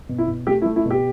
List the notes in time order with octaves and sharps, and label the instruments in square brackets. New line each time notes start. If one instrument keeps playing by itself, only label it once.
[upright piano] B2
E4
B2
A3 G4
E4
A3
E4
B2
G4